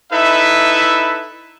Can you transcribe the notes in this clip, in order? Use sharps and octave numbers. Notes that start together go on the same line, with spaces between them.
D#4 E4 A4 B4 E5